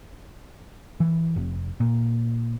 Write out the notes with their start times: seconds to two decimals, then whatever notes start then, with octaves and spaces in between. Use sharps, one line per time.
1.00 E3
1.36 F1
1.80 A#2